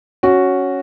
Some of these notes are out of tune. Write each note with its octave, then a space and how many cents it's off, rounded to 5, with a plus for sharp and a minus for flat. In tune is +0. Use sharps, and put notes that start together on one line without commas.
C#4 +0 F#4 +0